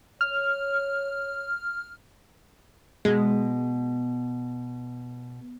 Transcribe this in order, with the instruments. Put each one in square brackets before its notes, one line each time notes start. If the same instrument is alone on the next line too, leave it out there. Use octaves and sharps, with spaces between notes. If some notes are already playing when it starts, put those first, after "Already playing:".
[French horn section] C#5 [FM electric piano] F6
[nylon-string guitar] B2 [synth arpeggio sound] G#3